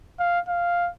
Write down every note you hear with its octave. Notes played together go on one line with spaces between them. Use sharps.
F5
F5